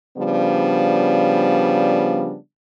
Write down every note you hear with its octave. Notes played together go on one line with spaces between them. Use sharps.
C#3 F3 G3 B3 D4